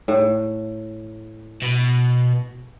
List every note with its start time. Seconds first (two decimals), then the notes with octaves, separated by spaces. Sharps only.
0.08 A2
1.62 B2